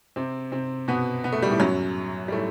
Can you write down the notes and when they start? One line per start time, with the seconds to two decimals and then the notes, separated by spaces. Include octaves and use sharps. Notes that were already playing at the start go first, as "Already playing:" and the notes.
0.16 C3 C4
0.52 C3 C4
0.88 B2 B3
1.24 B3
1.33 A3
1.42 G3
1.50 A2 A3
1.60 F#2 F#3
2.28 G3
2.32 A2 A3